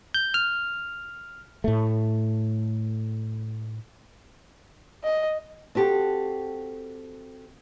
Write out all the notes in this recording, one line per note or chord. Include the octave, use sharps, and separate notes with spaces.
G6
F6
A2 A3
D#5
C4 F#4 G4 A4